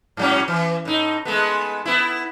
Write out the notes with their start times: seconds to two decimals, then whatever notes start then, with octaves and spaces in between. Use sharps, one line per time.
0.17 G#2 F#3 C#4
0.48 E3
0.85 A2 D#4
1.25 G#3 A3 B3
1.85 B3 E4